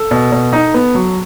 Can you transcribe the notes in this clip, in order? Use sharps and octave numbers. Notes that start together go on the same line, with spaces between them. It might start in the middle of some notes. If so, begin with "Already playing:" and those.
Already playing: A4
B2
B2
D#4
B3
F#3